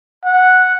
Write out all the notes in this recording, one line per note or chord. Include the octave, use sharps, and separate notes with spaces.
F#5